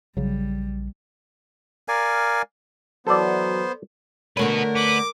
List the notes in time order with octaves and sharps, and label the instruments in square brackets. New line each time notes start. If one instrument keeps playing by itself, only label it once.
[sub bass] A#1 [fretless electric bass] C#3 F#3 [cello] G3
[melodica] A#4 D5 F5 G#5
[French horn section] E3 F#3 [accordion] B3 C5 [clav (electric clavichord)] A4 D5
[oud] D3 A3 C#5 [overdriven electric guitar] F#4 B4 [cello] A#4
[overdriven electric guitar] B3 [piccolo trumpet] D6